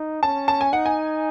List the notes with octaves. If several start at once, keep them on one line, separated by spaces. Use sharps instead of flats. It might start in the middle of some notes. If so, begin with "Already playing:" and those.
Already playing: D#4
C#4 A5
A5
G#5
D#4 F#5
G#5